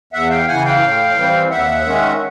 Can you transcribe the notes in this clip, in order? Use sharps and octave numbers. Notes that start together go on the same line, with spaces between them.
E2 E5 F#5
F5 G5
C#3 E3 F#5 G#5
F5 G5
A2
E3 G3 C4
D#2 E5 F#5
D#3 G#3 C#4